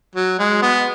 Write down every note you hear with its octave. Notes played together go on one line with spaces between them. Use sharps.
F#3
G#3
B3